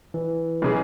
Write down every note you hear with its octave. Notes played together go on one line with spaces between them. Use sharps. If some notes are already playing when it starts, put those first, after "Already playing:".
E3
B1 C#3 G#4